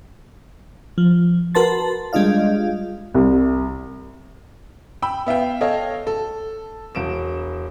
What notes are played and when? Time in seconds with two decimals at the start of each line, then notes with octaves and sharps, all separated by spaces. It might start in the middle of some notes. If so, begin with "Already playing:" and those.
0.98 F3
1.55 F#4 A#4 B4 A5 C6 A6
2.13 G3 G#3 D4 F4 D#5 F5
3.14 C2
5.02 G5 B5 E6
5.27 B3 E5 F5 G5
5.61 A4 C#5 D#5 F5 G5
6.07 A4
6.95 E1 D7 E7